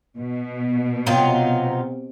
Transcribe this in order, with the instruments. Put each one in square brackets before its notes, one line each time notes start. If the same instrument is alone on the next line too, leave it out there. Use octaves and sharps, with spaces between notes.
[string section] B2
[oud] C3 [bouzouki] F#3 D#4 F4